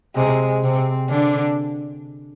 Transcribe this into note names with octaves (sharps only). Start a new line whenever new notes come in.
C3 G#3
C3 C4
D3 D4